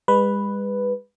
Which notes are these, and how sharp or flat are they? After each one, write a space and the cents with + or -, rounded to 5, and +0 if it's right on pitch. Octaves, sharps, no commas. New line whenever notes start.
G#3 -45 B4 +0